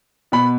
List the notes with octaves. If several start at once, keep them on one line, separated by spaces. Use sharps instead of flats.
B2 B5